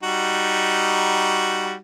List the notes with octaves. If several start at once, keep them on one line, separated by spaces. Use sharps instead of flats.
G3 D#4 F#4